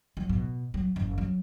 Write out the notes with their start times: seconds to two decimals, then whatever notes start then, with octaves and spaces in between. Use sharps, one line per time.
0.17 F#3
0.29 B2
0.74 F#3
0.96 F#1
1.18 F#3